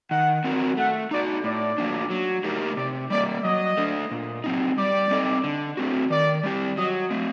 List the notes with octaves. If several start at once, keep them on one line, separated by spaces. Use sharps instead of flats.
D#3 F#5
F#3 C4 F#4 A#4
A3 F#5
D#4 F#4 D5
A2 D5
F#3 A#3 D4
F#3
A3 D#4 G4 A#4
C3 D5
G3 A#3 D5
F#3 D#5
A3 D4
A#2
F#3 C4 D#4
G3 D5
C4 D#4 A4 D#5
D3
A3 C4 F#4
D#3 D5
G3 C4 G4
F#3 D#5
A3 C4